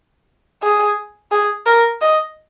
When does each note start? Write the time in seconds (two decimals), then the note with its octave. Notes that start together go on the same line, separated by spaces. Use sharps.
0.63 G#4
1.31 G#4
1.66 A#4
2.01 D#5